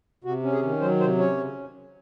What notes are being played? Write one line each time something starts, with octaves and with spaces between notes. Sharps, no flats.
C3 F#4
C#4
G#4
D#3
F#3 C5
C3 C5
C#4 C#5
C#3